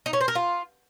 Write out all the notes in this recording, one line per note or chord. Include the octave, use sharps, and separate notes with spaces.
D#4
C#4
C5
A#4
F4